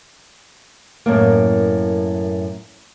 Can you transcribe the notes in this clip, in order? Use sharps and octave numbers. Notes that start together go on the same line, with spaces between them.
F#2 A2 A#3